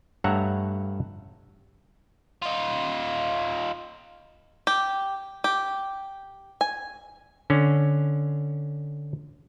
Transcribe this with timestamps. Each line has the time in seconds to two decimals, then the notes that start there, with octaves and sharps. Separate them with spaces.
0.24 G2 A3 C#5 E5 F#5 A#5
2.42 D#4 F4
4.67 G4
5.44 G4
6.61 G#5
7.50 D3 C#4